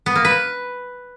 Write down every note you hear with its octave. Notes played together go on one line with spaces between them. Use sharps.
B3
A#3
B4